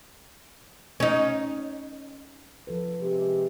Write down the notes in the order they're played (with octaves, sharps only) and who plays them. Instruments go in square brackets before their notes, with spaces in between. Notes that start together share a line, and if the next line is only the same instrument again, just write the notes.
[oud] C#4 D#4
[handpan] F3 A4 B4
[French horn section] C3 G#3 G4